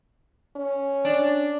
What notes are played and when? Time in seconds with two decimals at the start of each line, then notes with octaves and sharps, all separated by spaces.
0.56 C#4
1.05 D4